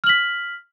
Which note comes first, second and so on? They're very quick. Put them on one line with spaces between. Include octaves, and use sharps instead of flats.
F6 F#7 B6